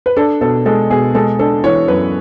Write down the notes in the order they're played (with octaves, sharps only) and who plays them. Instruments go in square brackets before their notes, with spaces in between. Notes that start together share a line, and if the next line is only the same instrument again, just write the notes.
[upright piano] B4
D4 A4
B2 A4
G#3 A4
B2 G#4
G#3 A4
D4 A4
E3 C#5
F#2 B4